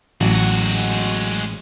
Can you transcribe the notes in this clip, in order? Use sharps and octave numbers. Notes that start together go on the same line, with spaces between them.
A1 F#3 G#3 F#4